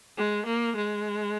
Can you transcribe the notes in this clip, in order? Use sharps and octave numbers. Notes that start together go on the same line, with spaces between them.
G#3
A#3
G#3